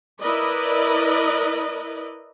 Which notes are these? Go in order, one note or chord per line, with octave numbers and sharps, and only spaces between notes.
E4 A#4 B4 D5 D#5